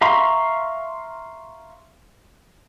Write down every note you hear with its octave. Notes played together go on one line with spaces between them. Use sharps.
E5 F5 A#5 C6 C#6